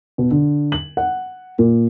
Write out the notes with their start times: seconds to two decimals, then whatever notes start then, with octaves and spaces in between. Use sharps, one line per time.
0.18 B2
0.31 D3
0.72 F#7
0.97 F#5
1.59 A#2